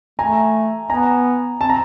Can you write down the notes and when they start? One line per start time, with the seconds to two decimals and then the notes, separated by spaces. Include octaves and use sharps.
0.19 A3 G#5 A#5
0.90 B3 G#5 A#5
1.61 C4 A5
1.69 A#5